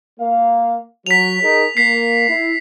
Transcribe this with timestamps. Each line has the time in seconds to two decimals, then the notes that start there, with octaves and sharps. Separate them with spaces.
0.20 A#3 F5
1.06 F#3 B6 F7
1.42 D#4 G#4 A#4
1.77 A#3 B6 C7
2.29 E4